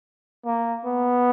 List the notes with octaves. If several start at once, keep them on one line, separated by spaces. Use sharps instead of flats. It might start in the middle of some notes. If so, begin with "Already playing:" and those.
A#3
B3